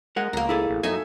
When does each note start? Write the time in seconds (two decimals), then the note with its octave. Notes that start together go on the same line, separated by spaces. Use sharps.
0.16 G#3 A#4 F#5
0.33 C#2 A#3 A#5
0.49 E4 G#4 A4
0.69 A1
0.83 F#2 D#4 A4 E5 G#5